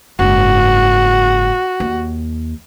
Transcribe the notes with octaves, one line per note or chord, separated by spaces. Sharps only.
F#1 G#2 F#4
D#2